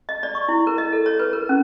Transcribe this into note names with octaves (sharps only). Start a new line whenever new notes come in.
D#5
D5
C#6
E4
A#4
D#5
A4
C#5
B4
A#4
C#4